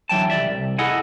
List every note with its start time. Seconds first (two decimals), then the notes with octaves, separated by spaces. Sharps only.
0.09 D3 E3 F#3 G5 A5
0.30 C2 F#2 D5 E5
0.48 C2
0.78 E4 G#4 A4 D#5 F#5 G#5